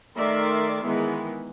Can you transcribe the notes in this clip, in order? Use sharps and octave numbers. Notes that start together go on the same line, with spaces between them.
D#3 A3 A#4 D5 E5 C6
D#3 E3 G#3 B3